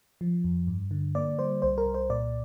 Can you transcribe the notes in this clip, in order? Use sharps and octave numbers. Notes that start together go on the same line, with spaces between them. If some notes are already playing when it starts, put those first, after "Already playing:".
F3
F2
G2
D3
A#3 D5
G3 C5
C2 C5
A#4
C2
C5
A#2 D5